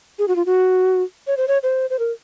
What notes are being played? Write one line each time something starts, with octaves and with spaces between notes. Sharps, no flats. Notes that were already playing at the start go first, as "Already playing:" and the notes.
G#4
F#4
F4
F#4
C#5
C5
C#5
C5
C5
A#4